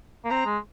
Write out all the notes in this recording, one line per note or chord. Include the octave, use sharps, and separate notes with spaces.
A#3
C4 A#5
G#3